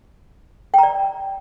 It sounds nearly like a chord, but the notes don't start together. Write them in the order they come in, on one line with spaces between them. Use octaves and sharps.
G5 A#5 D5